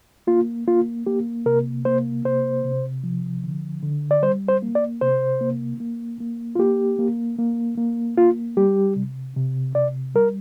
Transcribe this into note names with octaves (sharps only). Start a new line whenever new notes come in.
A#3 F4
A#3 F4
A#3 G4
C3 A#4
A#3 C5
C3 C5
C3
F3
D3
D3
D5
G3 C5
C5
A#3
D5
C3 C5
A#3
A#3
A#3
F4
A#3 G4
A#3
A#3
A#3
A#3 F4
G3 G4
C3
C3
C3 D5
G3 A#4